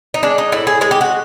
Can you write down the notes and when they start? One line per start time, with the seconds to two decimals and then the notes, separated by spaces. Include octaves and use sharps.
0.14 D#4
0.23 G#3 D4
0.38 D#4
0.52 A2 E4
0.67 G#4
0.81 G#3 G#4
0.91 G4
1.01 F#4